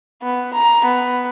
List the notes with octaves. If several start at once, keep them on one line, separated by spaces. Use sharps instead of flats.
B3
A#5
B3